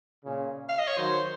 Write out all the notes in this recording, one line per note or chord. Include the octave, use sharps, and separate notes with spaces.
A#2 C#3
F5
D#5
C#5
D#3 F#3 C5